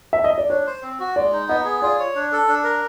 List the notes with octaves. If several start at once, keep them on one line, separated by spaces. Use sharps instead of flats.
E5
D#5
D5
D4 C#5
C5
C4
F#4
G#3 D5
D#4
B3 D#5
G#4
F4 D5
C#5
D4
A4
D4
A#4